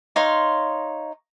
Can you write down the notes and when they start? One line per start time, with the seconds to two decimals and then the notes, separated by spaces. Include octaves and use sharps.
0.16 D#4 C#5 F5 C6